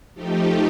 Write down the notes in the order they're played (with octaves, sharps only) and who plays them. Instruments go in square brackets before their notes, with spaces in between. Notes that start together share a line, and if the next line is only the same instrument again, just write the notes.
[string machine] F3 A3 D#4 G4